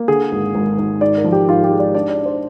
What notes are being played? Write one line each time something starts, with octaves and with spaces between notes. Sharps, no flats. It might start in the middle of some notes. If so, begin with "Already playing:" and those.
Already playing: A#3
D3 G#4
G#1
G#1
G#1
G#2 D5
A#4
F3
G4
G#2 F4
G4
G#3
D5
D4 D5
D5
D4
C5